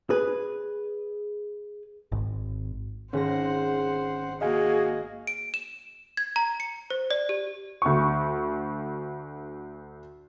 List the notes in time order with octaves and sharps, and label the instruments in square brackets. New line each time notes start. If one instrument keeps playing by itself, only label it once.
[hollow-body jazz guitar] G#4 B4
[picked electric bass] G#1
[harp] G#1 A#6 [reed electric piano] C#4 G#4 [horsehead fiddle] C5 F#5
[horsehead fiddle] A#3 F#4 [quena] G#4 [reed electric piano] D#5 F5 G#5
[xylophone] D7
E7
G#6
A#5
C#7
C5
D5
G4
[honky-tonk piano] D2 C#6